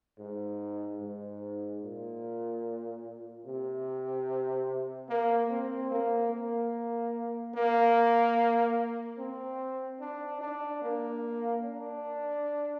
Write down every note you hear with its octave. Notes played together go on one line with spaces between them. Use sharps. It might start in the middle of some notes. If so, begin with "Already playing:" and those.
G#2
G#2
A#2
C3
A#3
C4
A#3
A#3
A#3
C4
D4
D4
A#3
D4